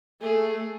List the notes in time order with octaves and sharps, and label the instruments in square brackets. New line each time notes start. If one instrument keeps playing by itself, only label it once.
[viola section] A3 [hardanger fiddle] G#4